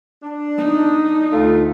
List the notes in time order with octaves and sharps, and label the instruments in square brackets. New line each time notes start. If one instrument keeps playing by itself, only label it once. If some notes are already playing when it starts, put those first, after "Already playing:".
[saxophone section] D4
[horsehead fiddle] D#4
[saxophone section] D2 A3 F4